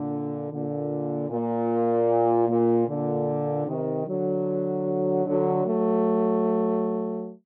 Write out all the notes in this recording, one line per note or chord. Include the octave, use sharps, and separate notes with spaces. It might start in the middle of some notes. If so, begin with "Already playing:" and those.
Already playing: A#2 D3
A#2 D3
A#2
A#2
A#2 D3
C3 D#3
D3 F#3
D3 F#3
F#3 A3